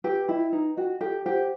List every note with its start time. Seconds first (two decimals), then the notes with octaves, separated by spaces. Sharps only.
0.04 G4 B4
0.28 E4 D#5 G5
0.53 D#4 B4
0.77 F#4 D#5 G5
1.01 G4 A4
1.25 G4 C5 F#5